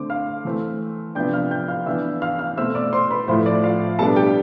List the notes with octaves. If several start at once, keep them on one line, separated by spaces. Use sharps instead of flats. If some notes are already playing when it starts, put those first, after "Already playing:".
Already playing: D3 A3 C4 D6
F5 F6
E3 A3 C4
C3 F3 B3 D4 G5 G6
F5 F6
G5 G6
F5 F6
E3 B3 D4 E5 E6
F5 F6
F5 F6
B2 A3 C4 E5 E6
D5 D6
C5 C6
B4 B5
A2 F3 A3 C5
D5
F4 F5
B2 G3 B3 D4 A4 A5
G4 G5